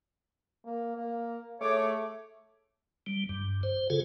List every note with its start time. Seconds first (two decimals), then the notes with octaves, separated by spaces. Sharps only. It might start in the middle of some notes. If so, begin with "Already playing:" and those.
0.65 A#3
0.97 A#3
1.61 A3 G#4 C#5 D6
3.06 G3
3.29 G2
3.63 C5
3.90 C#3 F4 G#4 A4